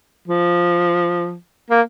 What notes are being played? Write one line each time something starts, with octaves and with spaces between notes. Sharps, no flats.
F3
A#3